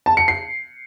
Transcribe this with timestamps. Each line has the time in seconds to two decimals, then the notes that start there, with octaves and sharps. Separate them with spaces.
0.06 A5
0.17 C#7
0.28 C7